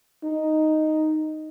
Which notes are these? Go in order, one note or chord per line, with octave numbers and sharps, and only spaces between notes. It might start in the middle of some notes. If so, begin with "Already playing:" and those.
D#4